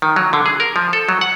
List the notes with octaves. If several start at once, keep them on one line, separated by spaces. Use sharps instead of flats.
D#3
F#3
D3
G#4
A#4
F3
A4
F#3
F#5